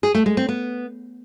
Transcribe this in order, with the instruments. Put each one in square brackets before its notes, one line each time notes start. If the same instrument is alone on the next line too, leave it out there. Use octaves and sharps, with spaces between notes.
[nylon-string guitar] G#4
A3
G#3
C4
B3